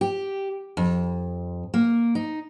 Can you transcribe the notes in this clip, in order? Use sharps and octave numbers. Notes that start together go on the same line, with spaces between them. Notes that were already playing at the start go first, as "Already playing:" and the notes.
G4
F2
A#3
D#4